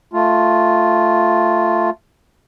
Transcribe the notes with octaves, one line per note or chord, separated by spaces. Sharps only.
A3 F4